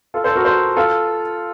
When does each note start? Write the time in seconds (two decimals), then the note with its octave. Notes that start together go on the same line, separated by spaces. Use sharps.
0.14 F4 A4
0.24 A4 C5
0.36 F#4 A#4
0.45 A4 C5
0.77 F4 A4